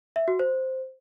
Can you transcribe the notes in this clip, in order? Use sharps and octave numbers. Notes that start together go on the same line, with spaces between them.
E5
F#4
C5